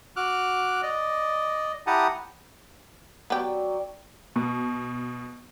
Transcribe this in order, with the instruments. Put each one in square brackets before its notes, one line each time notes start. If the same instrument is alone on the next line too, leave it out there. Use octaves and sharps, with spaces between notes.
[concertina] F#4 D6 F6 F#6
D5 D#5
E4 G4 F#5 A5 A#5 D#6
[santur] F#3 D5 G5 [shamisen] B3 G4
[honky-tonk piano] B2